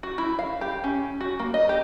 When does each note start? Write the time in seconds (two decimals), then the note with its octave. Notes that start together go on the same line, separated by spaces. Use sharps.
0.03 F#4
0.18 E4
0.39 F5
0.61 G4
0.84 C#4
1.21 F#4
1.39 A#3
1.54 D#5
1.69 G4